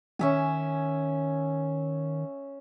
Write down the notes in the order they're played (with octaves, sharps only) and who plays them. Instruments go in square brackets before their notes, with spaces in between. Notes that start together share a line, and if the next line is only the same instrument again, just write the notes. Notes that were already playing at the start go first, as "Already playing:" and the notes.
[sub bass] D#3 [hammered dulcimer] C#4 E5 G#5